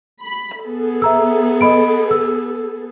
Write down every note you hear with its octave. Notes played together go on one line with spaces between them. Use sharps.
B5
B3 G#4 A4
E5 A#5 E6
D#5 B5 D7
E6